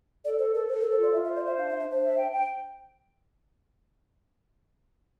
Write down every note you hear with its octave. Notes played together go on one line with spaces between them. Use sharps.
A4 D5
A4 C5
A4 A#4
A4 C5
A#4
A4
C5
F4 D5
F4 E5
E5
C5
D5
C5 E5
D4 F5
E5
D4
E5
D4 C5
E5
G5
G5